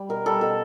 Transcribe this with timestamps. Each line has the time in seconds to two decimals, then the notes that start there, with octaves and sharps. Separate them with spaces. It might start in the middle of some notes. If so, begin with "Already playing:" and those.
Already playing: G3
0.09 B2 A#4
0.26 G3 A4
0.41 B2 A4